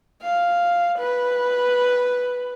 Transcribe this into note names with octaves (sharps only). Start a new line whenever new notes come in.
F5
B4